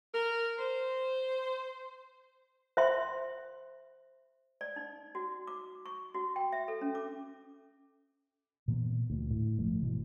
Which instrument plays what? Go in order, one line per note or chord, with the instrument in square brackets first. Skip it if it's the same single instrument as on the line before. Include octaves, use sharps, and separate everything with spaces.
[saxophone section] A#4
C5
[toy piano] C5 E5 C6
D5
D#4
F#4
D6
C#6
F#4
G5
E5
A4
C#4
D6
[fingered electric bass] A#2 E3 A#3 B3
D2 A#2
A2
G1 F3 A3
B2 E3 F#3